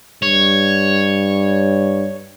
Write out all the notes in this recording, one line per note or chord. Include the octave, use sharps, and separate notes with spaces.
G2 C#5